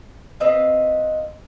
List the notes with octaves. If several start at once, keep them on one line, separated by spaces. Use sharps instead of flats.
C4 B4 D#5 F5